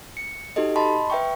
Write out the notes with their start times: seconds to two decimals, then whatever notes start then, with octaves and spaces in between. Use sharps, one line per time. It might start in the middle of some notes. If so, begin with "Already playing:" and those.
0.17 C#7
0.56 D#4 F#4 G4 A4 D#5
0.76 D#5 A5 B5 C6
1.10 B4 E5 G5 C#6